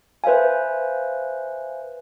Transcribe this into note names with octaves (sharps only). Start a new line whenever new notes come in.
B4 C5 E5 F5 G#5